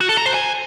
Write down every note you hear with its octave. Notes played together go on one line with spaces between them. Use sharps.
F#4
A4
A#5
C5
G#5